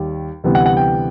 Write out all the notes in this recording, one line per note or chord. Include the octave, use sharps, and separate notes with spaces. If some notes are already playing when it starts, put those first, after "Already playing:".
Already playing: D#2 D#3 G3
D2 C3 E3 G3 B3
F#5
F#5
G5